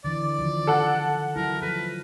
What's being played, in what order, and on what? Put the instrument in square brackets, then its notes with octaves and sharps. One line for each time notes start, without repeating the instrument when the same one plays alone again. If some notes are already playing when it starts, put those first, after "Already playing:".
[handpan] D3 E3 [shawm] D5
[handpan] D3 D#3 F3
[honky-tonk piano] A4 F#5
[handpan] F#3 E4 [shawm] A#4
[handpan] F3 A4 [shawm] B4